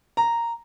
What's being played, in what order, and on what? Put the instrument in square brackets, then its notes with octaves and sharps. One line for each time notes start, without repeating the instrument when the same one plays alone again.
[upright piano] A#5